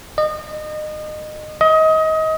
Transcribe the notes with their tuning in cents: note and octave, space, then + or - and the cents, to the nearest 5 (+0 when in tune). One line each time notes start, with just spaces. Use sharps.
D#5 -30
D#5 +25